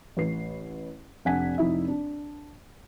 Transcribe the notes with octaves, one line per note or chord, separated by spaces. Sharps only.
A1 B4 C7
F1 D4 F#5 G#5 B6
F1 D#4 E4 E5
D4